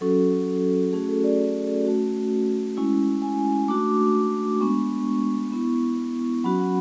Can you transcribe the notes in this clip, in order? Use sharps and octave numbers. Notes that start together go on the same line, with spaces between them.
F#3 C#4 F#4 A4
A3 C#4 F#4 G#4
A4
D5
A3 C#4 F#4
G#3 C#4 E4
G#5
A3 D4 F#4 D6
G#3 B3 D4 C#6
B3 E4
F#3 C#4 F#4 B5
F#5